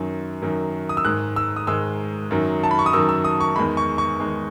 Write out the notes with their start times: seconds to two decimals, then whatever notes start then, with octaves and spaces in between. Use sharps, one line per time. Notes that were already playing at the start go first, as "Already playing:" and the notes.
Already playing: F#2 D#3 F#3
0.42 F#2 D#3 F#3
0.89 D#6
0.97 E6
1.05 G#2 D#3 G#3 F#6
1.36 E6
1.56 D#6
1.67 G#2 D#3 G#3 E6
2.31 F#2 D#3 F#3
2.63 A5
2.71 B5
2.79 C#6
2.86 D#6
2.93 F#2 D#3 F#3 E6
3.09 E6
3.25 D#6
3.40 C#6
3.56 E2 D#3 G#3 B5
3.77 C#6
3.98 C#6
4.19 E2 D#3 G#3